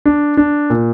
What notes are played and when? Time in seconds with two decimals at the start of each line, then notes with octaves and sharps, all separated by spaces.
0.06 D4
0.37 D4
0.70 A#2